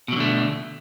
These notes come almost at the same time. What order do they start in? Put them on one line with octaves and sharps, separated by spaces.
B2 F#3 D3 A3